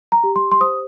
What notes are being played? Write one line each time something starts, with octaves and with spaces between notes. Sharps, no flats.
A#5
G4
C6
C6
C5 D#6